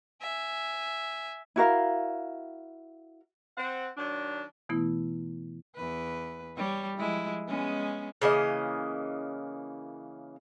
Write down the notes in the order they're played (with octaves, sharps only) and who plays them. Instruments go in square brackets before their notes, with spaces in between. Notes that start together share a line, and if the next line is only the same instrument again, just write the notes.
[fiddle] E5 G#5
[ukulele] E4 F#4 A#4 F5
[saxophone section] C4 F#5
D#3 F#3 D4
[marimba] B2 E3 A3 B3 E4
[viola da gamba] E2 B4
G3 C#5
F3 G#3 E4
G#3 B3 C#4
[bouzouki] C#3 E3 A#3 D#5